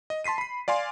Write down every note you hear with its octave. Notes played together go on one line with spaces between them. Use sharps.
D#5
A5 C6 B6 C7 D#7
B5 C7
D5 F5 G#5 C6